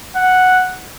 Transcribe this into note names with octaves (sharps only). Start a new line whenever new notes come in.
F#5